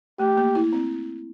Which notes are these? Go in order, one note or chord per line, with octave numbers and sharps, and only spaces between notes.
A3 G4
A#3
E4
C4